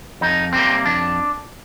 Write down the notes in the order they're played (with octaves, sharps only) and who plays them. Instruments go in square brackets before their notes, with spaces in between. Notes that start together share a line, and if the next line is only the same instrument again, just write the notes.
[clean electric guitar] F2 D#4
C3 G3 A#3 C4
F2 D4